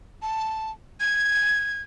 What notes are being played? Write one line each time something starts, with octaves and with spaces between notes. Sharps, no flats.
A5
G#6